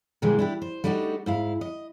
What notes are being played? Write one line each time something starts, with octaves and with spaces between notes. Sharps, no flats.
A#2 D3 E3 G3 G#3
D4 E4 G4
C5
G3 A3 D4 D#4 F#4
G#2 E4 F5
D#5